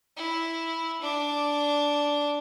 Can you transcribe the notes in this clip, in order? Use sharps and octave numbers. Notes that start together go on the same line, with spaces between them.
E4
D4 D6